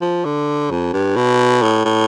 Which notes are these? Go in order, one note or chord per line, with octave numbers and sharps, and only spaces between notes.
F3
D3
F2
G2
B2
A2
A2